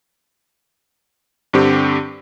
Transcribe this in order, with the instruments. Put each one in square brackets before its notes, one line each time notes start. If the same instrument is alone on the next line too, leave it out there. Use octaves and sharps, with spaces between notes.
[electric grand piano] G2 D3 C4 G4